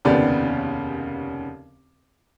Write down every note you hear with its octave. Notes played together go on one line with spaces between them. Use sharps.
F1 D#2 C#3 B3 G4 D5